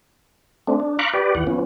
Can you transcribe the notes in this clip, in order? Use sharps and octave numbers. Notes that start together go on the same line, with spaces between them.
A3 C4 D4
D4
F5 A#5 B5 C#6 D6 F#6
G4 B4 D5
D#2 E3 F#5
F3 B3 C#4